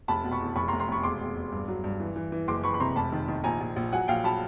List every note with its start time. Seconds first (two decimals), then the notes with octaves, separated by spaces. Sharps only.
0.08 F1 A5 B5
0.24 B2
0.32 B5 C#6
0.40 E2
0.56 F1 B5 C#6
0.68 A#5 C6
0.73 F1
0.80 A#5 C6
0.88 F1 B5 C#6
1.03 E1 C6 D6
1.21 E1
1.36 E1
1.52 G2
1.68 F#3
1.84 G2
2.00 E3
2.16 E3
2.32 E3
2.48 F#1 C6 D6
2.64 E3 B5 C#6
2.74 B5
2.80 C3 A#5 C6
2.96 F1 A5 B5
3.12 D#3
3.28 D#3
3.44 A#1 G#5 A#5
3.61 A#1
3.76 A#1
3.93 F#3 F#5 G#5
4.08 A#1 F5 G5
4.24 F#3 A5 B5